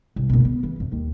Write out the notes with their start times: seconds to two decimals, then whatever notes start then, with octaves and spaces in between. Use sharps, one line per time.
0.16 C2
0.30 F#1 B2
0.45 B3
0.63 E3
0.80 F2
0.92 D#2